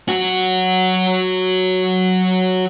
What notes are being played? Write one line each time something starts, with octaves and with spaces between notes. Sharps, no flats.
F#3 F#4